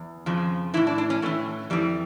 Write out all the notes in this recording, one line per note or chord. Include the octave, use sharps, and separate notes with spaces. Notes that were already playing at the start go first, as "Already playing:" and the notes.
Already playing: E2
F2 C#3 F3
A2 E3 E4
D4
D4
C#4
A2 E3 A3
F2 E3 G3